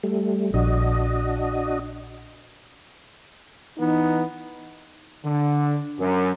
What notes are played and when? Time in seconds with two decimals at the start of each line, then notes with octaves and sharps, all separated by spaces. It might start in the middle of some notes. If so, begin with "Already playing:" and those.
0.03 G3 A3
0.54 A#1 D4 F#4 D#5
3.78 E3 B3 D#4
5.24 D3
5.99 F#2